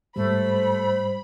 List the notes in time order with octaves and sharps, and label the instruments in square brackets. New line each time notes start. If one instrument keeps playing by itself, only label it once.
[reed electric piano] G#2 G3 [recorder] A3 [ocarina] C5 [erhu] B5